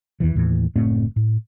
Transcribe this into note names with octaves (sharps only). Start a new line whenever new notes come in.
E2 D#3 E3
D#2 A2 E3
F#1 A2 A3 C4
A2